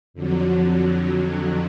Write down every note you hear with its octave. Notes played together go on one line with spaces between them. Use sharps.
F2 D3 F#3